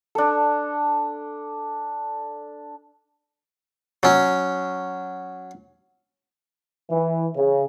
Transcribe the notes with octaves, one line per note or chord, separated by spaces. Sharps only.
D4 A4
F#3 C#4
E3
C#3